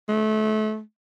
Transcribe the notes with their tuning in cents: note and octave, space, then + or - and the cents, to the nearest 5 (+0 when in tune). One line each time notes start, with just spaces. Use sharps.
A3 -30